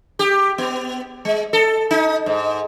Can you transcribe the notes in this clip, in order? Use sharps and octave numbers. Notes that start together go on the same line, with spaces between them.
G4
B3
G#3
A4
D#4
G#2